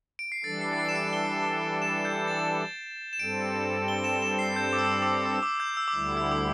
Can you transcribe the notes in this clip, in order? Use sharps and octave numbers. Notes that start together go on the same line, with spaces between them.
D7
C7
E3 G3 D4 A4 A6
C7
A6
C7
E7
D7
G7
E7
G6
A6
E7
G2 G3 C4 A4 D7
G7
E7
E7
C7
G6
D6
E6
D6
E6
E6
D6
G6
E6
D6
D2 D3 G3 E4 E6
E6
D6